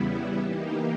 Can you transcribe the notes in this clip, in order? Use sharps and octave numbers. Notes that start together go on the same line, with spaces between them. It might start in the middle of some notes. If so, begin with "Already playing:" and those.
Already playing: E2 C#3 G3 B3 E4
E3 A#3 D#4 G4